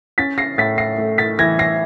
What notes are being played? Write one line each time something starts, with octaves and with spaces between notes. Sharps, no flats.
C#4 A6 B6
A#6 C7
A2 A6 B6
A#6 C7
A3
A6 B6
E3 G#6 A#6
A#6 C7